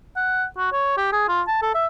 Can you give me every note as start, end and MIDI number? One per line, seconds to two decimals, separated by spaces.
0.16 0.44 78
0.57 0.72 66
0.72 0.97 73
0.98 1.10 67
1.13 1.24 68
1.29 1.42 65
1.47 1.57 81
1.62 1.72 69
1.75 1.86 76